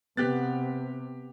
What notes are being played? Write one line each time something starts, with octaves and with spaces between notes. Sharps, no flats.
C3 B3 G4 F#6 A6